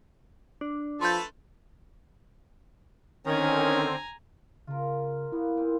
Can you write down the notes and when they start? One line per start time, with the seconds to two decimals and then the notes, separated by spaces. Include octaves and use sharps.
0.61 D4
1.01 F3 A3 A4 B4 C6 G6
3.27 D3 D#3 C4 C#4 G#5 A#5
4.67 C#3 F4 A#4
5.32 A#3 B3 E4
5.57 A#2 C4